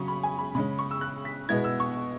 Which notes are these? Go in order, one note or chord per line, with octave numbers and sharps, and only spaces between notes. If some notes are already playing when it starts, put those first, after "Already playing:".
Already playing: C#3 F#3 C#4 C#6
B5
G#5
B5
C#3 G#3 C#4 B5
C#6
E6
F#6
B6
B2 G#3 B3 E4 G#6
E6
C#6